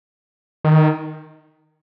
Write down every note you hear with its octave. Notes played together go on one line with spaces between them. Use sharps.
D#3